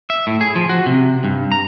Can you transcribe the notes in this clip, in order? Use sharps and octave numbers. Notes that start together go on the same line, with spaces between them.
E5
A2
G#4
F3
F#4
C3
G2
A#5